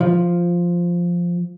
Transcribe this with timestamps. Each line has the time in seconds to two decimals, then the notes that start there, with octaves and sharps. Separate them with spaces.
0.01 F3